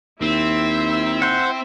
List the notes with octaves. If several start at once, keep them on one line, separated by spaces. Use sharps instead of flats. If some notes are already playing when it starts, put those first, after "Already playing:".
D#2 C4 E4 E5
C5 F#5